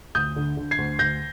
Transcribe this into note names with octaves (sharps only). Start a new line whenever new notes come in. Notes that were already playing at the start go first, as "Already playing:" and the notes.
D2 D#6 G6
D3
D3
G#6 C7
D2
D2 G6 A#6